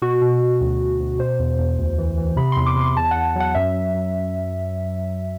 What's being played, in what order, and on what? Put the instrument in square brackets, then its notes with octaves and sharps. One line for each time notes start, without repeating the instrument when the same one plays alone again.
[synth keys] B2 F#4
B2
B2
D2
D2
D2
B2 C5
E2
E2
D2
E3
E3
C3 B5
E2 C6
D6
C3
C6
E2 A5
E2 F#5
F#3 F#5
F#2 E5
F#2
F#2